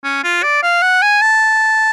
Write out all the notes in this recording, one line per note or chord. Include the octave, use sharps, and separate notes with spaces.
C#4
F4
D5
F5
F#5
G#5
A5